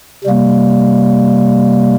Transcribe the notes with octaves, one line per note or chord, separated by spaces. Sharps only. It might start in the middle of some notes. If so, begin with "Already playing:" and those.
C3 G3 A#3